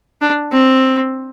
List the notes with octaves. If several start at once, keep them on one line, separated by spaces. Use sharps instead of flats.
D4
C4